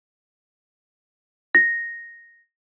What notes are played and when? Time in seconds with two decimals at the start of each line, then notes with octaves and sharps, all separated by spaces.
1.55 A#6